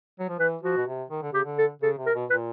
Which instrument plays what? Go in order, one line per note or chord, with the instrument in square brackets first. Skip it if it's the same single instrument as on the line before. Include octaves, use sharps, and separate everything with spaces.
[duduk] F#3
F3
[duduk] E3 [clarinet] B4
[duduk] F3 [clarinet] F#4
[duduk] B2
C3
D#3
D3
[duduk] C#3 [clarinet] G4
[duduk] D3
[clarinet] A4
[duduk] C#3 [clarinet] A4
[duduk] C3
[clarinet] A#4
[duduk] B2
[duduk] A#2 [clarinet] B4